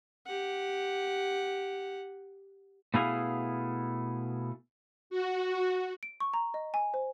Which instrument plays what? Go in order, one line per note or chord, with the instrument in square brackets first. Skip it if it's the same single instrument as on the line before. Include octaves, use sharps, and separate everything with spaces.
[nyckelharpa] G4 F#5
[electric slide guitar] B2 A3 B3 E4 G#4 F5
[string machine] F#4
[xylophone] D7
C#6
A#5
D#5
G#5
C5